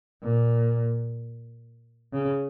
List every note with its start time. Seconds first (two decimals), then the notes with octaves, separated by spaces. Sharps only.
0.23 A#2
2.14 C#3